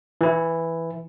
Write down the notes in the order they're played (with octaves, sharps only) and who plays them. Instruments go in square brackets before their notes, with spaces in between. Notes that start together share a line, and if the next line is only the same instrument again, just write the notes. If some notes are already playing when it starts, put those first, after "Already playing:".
[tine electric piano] E3 E4